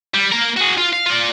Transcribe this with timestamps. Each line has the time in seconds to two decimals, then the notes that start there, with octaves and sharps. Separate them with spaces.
0.14 G3
0.32 A#3 A#4
0.57 F#4 G#4
0.77 F4
0.93 F5
1.06 F4 D5